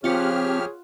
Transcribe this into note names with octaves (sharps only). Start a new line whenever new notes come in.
F3 C4 F4 G4 G#4 C#5 F#5 F6